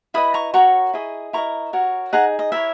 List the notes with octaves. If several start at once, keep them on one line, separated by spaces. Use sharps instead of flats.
E4 B4 D#5 B5 D#6
A#5 C#6
F#4 A#4 C#5 A#5 C#6
E4 G#4 D#5
E4 A#4 D#5 A#5 C#6
F#4 A#4 C#5
D#4 G#4 D#5 F#5 A#5
D#5
E4 A#4 C#5 E5